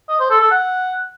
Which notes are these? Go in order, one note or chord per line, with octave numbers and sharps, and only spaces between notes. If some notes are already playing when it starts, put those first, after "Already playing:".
D#5
C5
A4
A4
F#5